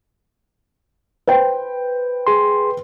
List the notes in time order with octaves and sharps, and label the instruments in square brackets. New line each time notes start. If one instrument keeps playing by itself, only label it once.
[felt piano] B4 C5 G5
[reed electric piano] G#4 C6